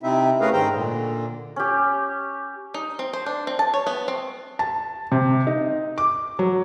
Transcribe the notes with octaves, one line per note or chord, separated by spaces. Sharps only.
C3 C4 D#4 E4 E5
A3 C#4 G#4 A#4 B4 F5
G#2 D#3 C5 G5 A#5
A#2 D3
C#4 G4
D#4
C4
C5
D4
C4
A5
C#5
B3
C4
A5
C3
D#4
D6
F#3